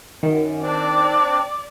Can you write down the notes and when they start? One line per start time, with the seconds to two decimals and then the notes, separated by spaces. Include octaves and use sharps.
0.23 F#2 D#3
0.62 C4 D4 D5